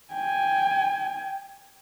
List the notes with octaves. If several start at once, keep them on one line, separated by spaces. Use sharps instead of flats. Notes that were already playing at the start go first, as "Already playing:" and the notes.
G5 G#5